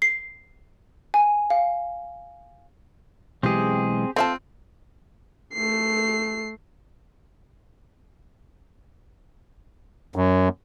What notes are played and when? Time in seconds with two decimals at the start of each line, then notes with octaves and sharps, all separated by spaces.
0.02 C7
1.14 G#5
1.50 F5
3.43 B1 E3 G#3 C4 G4 G#4
4.16 A3 C4 F4 E5 A5
5.54 A3 C7
10.16 F#2